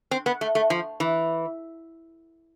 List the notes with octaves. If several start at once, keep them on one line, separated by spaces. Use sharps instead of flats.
C4
B3
A3
A3
F3
E3